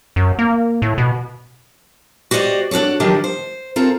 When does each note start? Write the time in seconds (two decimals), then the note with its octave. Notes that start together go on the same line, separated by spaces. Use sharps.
0.16 F#2
0.39 A#3
0.82 A2
0.98 B2
2.31 F#4 G4 C5 D5 D#5
2.71 D4 F#4 G#4 A4 C#5
3.00 D#3 F3 F#3 D4 G4
3.24 C5
3.76 C4 F4 A4 A#4